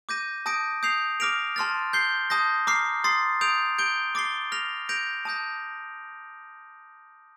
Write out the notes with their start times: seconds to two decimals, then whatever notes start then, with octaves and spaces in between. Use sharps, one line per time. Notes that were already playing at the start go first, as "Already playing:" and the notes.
0.09 D6 G6 A#6 D#7
0.46 A5 D#6 G6 A#6 D7
0.83 D#6 G6 C7 F7
1.20 D6 F6 A#6 D7 F7
1.56 A5 C6 F6 A6
1.93 G6 C7 G7
2.30 A5 D#6 G6 A#6
2.67 A#5 D6 F6 C7
3.04 C6 D#6 A6 C7
3.41 D#6 G6 D7 F7
3.78 G6 D7 G7
4.15 D6 A6 C7 G7
4.52 F6 A#6 F7
4.89 G6 A#6 D7 F7
5.25 A5 D#6 G6 A#6